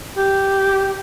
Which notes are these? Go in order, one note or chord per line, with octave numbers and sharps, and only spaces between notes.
G4